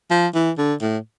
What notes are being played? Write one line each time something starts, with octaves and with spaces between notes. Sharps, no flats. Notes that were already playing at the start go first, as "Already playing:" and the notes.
F3
E3
D3
A2